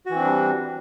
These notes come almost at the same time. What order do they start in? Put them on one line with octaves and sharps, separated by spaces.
F#4 E3 C4 D4 G3